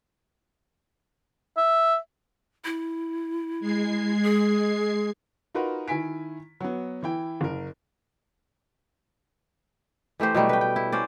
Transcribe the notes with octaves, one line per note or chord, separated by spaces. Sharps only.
E5
E4
G#3 G#6 C7
G#4
D#4 F4 F#4 A#4 B4
D#3 E4 G#5 B6 D7
F#3 B3
E3 E4 G5
F#1 A#4
E3 A3 G4 C5
B2 F#3 G3 A3
B4 G5
G5
E4
C#4 C5 D5